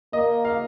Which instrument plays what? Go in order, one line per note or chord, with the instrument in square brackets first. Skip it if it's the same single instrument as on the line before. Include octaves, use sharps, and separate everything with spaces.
[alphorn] A#3 [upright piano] D#5
[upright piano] F5